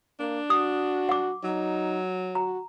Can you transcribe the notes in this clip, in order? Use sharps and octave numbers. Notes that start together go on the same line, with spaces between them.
A#3 D4
F#4 D#6
F#5 D6
F#3 D#4
F#4 A#5